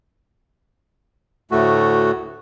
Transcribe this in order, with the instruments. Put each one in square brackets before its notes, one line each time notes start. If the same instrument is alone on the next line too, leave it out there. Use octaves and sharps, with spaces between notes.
[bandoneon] D2 A2 A3 F#4